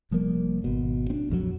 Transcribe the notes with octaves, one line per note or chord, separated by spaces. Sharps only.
F1 F3 G3 A#3
G#1 B2
C4 D4
A#1 F2 C#3 F#3